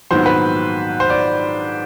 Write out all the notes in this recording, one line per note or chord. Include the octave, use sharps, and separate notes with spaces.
A#1 G#2 D#3 F#3 B3 C5
B4
C5
D5